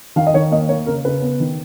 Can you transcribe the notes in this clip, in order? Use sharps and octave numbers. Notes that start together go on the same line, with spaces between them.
D#3 F5
D#5
D#3 C#5
A#3 D#5
A#3 C#5
C#3 A#4
C#3 B4
B3
D#3